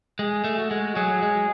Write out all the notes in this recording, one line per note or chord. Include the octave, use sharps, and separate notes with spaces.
G#3 G#4
A3
F#4
G#3
F#3 G#4
G#3